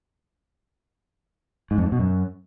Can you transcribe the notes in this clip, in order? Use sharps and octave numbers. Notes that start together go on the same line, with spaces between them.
G#2
F2
G#2
B2
F#2